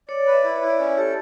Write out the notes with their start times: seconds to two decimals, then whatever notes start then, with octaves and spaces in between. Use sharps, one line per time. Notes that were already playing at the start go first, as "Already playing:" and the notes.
0.08 C#5 D5
0.26 B4
0.33 E5
0.44 E4
0.56 C#5
0.62 E4
0.70 D5
0.79 C#4 C#5
0.97 G4 A4